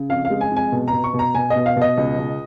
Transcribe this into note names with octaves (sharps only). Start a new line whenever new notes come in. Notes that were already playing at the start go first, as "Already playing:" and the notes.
Already playing: C#3
F2 F5
F5
G#3
G#5
F2
G#5
B2
A#5
B2
C#6
B2
A#5
B2 G#5
D#5
B2
F5
B2
D#5
C#2
C#2